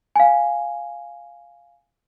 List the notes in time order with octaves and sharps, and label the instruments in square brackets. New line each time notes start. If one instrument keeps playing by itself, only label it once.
[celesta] F5 G#5